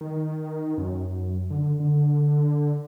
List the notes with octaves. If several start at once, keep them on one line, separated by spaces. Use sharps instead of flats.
D#3
F#2
D3
D3